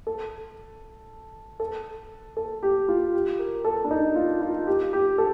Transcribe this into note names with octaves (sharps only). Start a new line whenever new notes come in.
A4
A4
A4
G4
F4
G4
A#4
A4
D4
D#4
F4
F4
G4
G4
A4